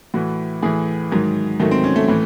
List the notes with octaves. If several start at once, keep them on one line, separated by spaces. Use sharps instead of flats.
A2 E3 F#4
A2 E3 G#4
G#2 D#3 F#3
G#2 D#3 F#3 A3
C4
C#4
A3
A2 E3